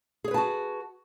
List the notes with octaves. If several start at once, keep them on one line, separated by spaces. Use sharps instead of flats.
F#4 G#4 B4 C#5 A5